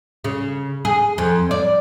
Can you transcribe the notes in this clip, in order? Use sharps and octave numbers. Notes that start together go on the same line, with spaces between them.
C#3
G#4
F2
D5